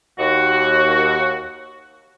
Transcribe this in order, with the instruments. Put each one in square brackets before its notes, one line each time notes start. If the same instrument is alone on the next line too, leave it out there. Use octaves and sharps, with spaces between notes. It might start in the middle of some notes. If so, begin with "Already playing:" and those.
[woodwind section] D#2 F#4